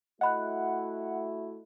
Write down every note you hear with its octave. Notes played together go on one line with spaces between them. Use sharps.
A3 E4 F#4 D#5 F#5 B5 F#6